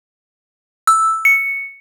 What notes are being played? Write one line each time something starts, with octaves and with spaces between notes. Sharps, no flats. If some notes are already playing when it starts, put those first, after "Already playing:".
E6
C#7